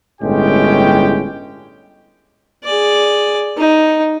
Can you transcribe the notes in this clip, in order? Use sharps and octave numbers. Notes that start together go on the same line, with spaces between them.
G1 A2 G#3 C#4 G4 G5
G#4 D5
D#4